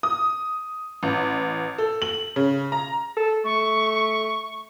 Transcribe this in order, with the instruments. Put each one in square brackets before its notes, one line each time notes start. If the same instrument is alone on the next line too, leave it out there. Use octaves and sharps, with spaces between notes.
[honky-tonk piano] D#6
A1
A4
F#7
C#3
A#5
[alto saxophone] A4
[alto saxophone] A3 [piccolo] C#6